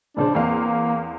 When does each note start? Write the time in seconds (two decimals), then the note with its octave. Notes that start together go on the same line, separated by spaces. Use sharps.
0.17 A#1 C#3 D4 C5
0.35 E2 A#3 C4 F5